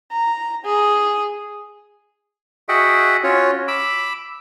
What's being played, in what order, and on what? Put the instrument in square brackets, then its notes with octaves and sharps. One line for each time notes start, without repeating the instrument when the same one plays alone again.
[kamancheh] A#5
G#4
[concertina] F#4 G#4 D#5 E5 F#5 G5
C#4 F4 F#4 C#5
B5 D6 E6